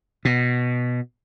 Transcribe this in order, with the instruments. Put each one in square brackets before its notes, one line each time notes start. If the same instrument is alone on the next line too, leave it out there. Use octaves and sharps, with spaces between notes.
[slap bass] B2